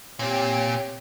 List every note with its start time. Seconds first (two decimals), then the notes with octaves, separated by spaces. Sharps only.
0.19 A#2 C4 G4 C#5